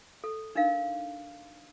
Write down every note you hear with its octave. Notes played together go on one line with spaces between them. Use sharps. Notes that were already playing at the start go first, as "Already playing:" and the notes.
A4
D4 D#4 A#4 F5